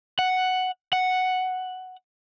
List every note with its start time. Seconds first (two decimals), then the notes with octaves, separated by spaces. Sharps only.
0.19 F#5
0.93 F#5